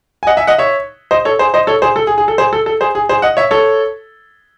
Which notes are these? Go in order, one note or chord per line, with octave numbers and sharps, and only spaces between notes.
G#5
D#5 F#5
E5 G#5
D#5 F#5
C#5 E5
C5 D#5
A4 C#5
G#4 C5
C5 D#5
A4 C#5
G#4 C5
A4
G#4
G#4
A4
G#4 C5
A4
A4
G#4 C5
G#4
G#4 C5
D#5 F#5
C#5 E5
A4 C#5